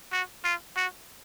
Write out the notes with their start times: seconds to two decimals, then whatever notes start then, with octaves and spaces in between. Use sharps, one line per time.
0.12 F#4
0.44 F4
0.77 F#4